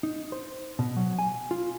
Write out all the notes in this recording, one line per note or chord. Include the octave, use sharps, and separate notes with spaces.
D#4
C5
B2
F#3
G#5
F4